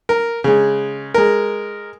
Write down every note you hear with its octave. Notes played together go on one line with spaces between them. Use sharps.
A#4
C#3 G#3
G#3 A#4